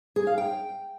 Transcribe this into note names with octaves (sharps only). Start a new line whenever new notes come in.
G#4
F5
G5